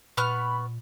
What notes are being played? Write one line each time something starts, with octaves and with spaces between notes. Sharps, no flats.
A#2 B3 B5 C#6 F6